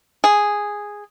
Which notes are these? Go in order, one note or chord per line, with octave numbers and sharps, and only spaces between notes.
G#4